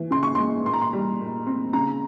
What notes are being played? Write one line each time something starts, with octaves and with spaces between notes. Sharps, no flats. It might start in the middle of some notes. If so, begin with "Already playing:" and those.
Already playing: E3
C#3 C6
C#6
G#3 C6
A#2 C6
A#5
C6
G3
A#2
C4
C#3 A#5